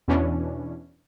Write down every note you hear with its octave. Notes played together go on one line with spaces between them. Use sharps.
E2 B2 E3 C#4 D4